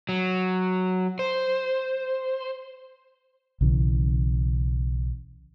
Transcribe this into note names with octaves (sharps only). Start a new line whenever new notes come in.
F#3
C5
B1 C#3 E3